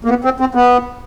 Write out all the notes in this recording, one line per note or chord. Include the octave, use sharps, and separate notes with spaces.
A#3
B3
C4
C4
B3